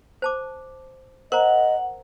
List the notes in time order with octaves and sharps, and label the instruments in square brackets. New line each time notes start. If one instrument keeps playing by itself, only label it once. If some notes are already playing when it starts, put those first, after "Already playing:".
[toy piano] C5 A5 D6
[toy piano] A#4 C5 A#5 [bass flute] D#5 [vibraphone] F#5